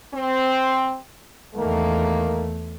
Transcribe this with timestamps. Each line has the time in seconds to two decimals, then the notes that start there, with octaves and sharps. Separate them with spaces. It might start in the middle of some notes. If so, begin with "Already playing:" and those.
0.13 C4
1.56 E2 D#3 A3 A#3